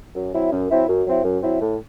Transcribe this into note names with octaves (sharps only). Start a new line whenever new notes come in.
F#2
F#3 C4 E4
F#2
F#3 C4 E4
F#2
F#3 C4 E4
F#2
F#3 C4 E4
A2